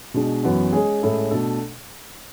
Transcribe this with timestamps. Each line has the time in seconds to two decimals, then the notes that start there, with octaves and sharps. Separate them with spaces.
0.14 B2 G#3 D4
0.44 F#2 E3 B3 F#4
0.73 G#3 C#4 G#4
1.02 A2 G#3 C#4 E4 A4
1.31 B2 A3 D4 A4